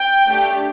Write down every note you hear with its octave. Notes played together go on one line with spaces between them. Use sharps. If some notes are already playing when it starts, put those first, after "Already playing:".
Already playing: G5
A3 D4 G4